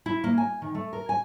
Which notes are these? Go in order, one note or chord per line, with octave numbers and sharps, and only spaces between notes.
E4
A#3
G#5
D#3
A3
A#4
G#5